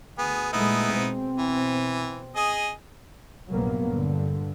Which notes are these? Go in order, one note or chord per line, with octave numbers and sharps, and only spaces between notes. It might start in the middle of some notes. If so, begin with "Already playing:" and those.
D2 B3 G#4
A#2 G#3 A3 B3 D#4 E4
B2 C4
E3
G#4 D#5
A#1 G2 C3 F#3 A#3 B3
G2 D3